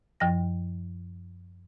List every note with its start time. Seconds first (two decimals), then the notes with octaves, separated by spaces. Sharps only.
0.20 F#2 F3 G5 A#6